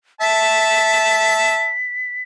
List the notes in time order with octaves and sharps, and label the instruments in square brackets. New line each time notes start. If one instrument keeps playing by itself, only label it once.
[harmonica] E5 A5 [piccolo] B6